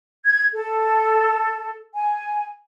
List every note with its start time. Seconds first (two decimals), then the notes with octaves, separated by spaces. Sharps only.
0.25 G#6
0.53 A4
1.94 G#5